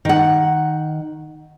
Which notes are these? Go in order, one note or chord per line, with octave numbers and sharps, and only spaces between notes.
D#3 F#5